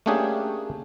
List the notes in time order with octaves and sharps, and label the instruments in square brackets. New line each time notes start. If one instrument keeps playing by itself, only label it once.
[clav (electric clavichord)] A3 A#3 C#4 D4 G4 G#4